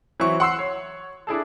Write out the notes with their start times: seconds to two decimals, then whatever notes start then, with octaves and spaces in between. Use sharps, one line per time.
0.20 E3 F#3 C4 E5 C#6
0.40 F#5 C6 E6 C7
0.59 C#5
1.27 D4 E4 G#4 A4